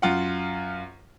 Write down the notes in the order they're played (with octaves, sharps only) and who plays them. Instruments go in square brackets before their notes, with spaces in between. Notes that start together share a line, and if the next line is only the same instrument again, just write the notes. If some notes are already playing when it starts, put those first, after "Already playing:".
[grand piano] F#2 F4 F#5